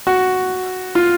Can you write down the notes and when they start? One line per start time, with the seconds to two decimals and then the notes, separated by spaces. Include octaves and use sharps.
0.07 F#4
0.95 F4